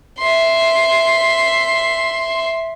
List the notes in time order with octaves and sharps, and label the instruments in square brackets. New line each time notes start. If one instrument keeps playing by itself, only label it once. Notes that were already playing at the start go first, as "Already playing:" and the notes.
[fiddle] E5 C6